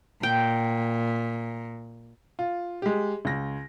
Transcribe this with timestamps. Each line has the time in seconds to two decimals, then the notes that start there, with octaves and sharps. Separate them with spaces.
0.23 A#2 G5
2.39 F4
2.82 G#3 G4
3.25 C#2 A#6